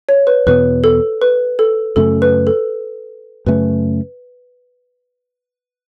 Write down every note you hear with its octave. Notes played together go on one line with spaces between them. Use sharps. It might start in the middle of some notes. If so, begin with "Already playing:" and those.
C#5
B4
E2 B2 B3 B4
A4
B4
A4
F#2 C#3 A3 C#4 A4
B4
A4
F#2 C#3 A3 C#4 B4